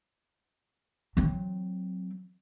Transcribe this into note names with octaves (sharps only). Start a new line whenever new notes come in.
F#3 C4